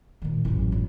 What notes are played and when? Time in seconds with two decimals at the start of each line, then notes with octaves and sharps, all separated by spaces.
0.22 A#2 D#3
0.45 A1 F#2
0.72 G1